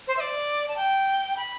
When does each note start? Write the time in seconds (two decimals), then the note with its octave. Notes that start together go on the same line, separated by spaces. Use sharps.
0.08 C5
0.17 E5
0.20 D5
0.68 A5
0.77 G5
1.37 B5